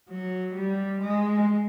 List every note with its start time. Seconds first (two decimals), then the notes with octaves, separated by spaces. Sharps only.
0.10 F#3
0.55 G3
1.01 G#3